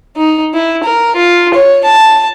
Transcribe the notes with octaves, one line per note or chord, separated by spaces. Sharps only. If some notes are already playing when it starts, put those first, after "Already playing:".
D#4
E4
A#4
F4
C#5
A5